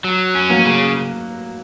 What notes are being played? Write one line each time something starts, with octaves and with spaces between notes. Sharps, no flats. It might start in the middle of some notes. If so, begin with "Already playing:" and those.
F#3
C#4
F#3 A#3
C#3